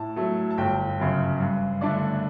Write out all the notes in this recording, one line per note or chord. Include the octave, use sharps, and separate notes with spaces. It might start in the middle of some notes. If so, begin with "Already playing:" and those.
Already playing: A2 A5
F#3 A3
A5
G1 G5
F#2 C#3
G2
D3 A3 D4 D5